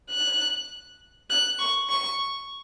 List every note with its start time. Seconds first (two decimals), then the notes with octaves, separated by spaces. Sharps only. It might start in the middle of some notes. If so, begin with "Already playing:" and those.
0.10 F#6
1.30 F#6
1.59 C#6
1.90 C#6